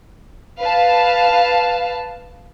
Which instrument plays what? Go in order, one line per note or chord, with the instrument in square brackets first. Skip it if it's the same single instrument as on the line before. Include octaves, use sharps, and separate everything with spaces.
[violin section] B4 F5 A5